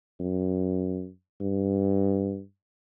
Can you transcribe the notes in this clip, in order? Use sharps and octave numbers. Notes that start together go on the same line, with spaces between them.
F#2
G2